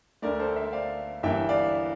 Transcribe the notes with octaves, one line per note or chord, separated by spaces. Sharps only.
D2 D3 A3 A#4 D5
A4 C5
C5 E5
D5 F5
G1 G2 E3 A#3 E5 G5
D5 F5